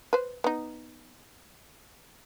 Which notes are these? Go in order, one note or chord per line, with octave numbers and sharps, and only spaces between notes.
B4 C5
B3 D#4